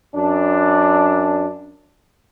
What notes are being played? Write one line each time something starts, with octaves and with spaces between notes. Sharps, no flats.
F#2 D4